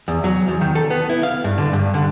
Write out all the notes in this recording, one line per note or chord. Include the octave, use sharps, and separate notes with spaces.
E2
F#3
E2
D#3
A4
B3
E4
F5
G2
D3
G2
D3